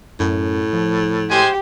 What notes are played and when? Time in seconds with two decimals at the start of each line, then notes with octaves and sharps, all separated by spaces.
0.20 F#2 A2
0.73 F3
1.30 G#3 G4 C5 G#5